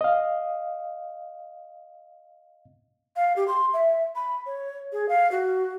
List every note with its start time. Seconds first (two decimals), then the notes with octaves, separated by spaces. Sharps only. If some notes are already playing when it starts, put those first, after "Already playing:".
0.01 D#5 F5
3.16 F5
3.36 G4
3.48 C6
3.73 E5
4.15 B5
4.46 C#5
4.93 G#4
5.09 F5
5.32 F#4